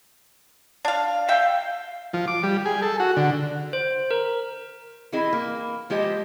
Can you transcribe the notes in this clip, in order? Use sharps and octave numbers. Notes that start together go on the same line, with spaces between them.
D4 F5
E5 F5 G5
F3
D6
G3
G#4
A4
F#4
D3
C5
A#4
E3 C4 E4 G#4 D#5
A#3
F3 G#3 G4 C5 D#5